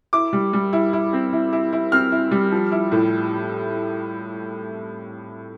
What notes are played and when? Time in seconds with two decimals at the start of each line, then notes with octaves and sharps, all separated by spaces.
0.13 E4 D6
0.33 G3
0.53 G3
0.73 E4
0.93 E4
1.13 C4
1.33 E4
1.53 E4
1.73 E4
1.92 C4 F6
2.12 E4
2.31 G3
2.52 F3
2.72 E4
2.92 A2